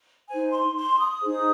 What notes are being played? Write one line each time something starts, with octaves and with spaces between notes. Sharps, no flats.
D#4 C5 G#5
C6
C6
D#6
D#4 G#4 C5